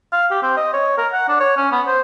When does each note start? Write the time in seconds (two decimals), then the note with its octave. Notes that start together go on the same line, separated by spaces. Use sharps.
0.13 F5
0.31 G4
0.43 C4
0.57 D#5
0.73 C#5
0.98 A#4
1.13 F#5
1.29 D4
1.40 C#5
1.57 C#4
1.72 B3
1.87 C5